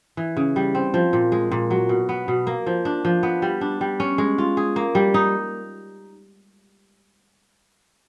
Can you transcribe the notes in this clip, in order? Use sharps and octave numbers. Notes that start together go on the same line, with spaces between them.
E3
C#3
G3
C4
F3
A#2
G#3
A#2
F#3
B2
B3
B2
A#3
F3
D4
F3
B3
G3
D4
G3
C#4
G#3
F4
G#4
A#3
G3
D#4